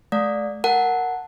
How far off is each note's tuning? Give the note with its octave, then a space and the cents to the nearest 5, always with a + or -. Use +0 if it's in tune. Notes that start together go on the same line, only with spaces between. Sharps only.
A3 -40 D5 +0 F5 +45
A#4 +0 F#5 +0 A5 +0